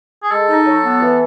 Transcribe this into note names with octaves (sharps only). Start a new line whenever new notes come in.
G#4
G#3 A4
D#4
F#3
B3
E3